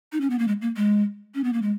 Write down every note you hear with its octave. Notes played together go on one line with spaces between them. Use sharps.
D#4
C#4
B3
A#3
G#3
A#3
G#3
C#4
B3
A#3
G#3